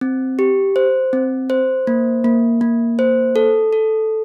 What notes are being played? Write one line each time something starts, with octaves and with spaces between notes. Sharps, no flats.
C4
G4
C5
C4
C5
A#3
A#3
A#3
C5
A4
A4